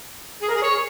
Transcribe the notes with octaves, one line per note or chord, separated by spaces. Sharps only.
G#4
A#4
G#4
C#5